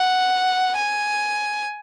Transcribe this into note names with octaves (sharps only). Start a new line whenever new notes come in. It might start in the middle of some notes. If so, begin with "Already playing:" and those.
Already playing: F#5
G#5